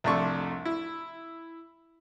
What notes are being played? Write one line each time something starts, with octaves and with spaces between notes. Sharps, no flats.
C2 F2 A3 D4 C#6
E4